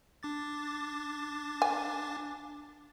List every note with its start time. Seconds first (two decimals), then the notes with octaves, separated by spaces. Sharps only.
0.23 D4 D6 A6
1.62 G#5